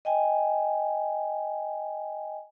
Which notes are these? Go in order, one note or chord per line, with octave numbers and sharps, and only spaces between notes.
D#5 G5 G#5